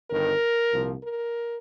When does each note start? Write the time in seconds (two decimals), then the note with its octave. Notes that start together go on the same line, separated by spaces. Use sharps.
0.11 G1 G2 D#3 A#4
0.73 C2 A#2 F3
1.04 A#4